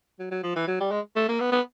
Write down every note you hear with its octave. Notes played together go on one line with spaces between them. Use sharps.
F#3
F#3
F3
E3
F#3
G3
G#3
A3
A#3
B3
B3